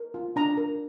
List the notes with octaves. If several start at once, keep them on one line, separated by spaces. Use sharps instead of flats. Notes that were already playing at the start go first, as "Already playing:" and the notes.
Already playing: A#4
F4
D4 A#5
A#4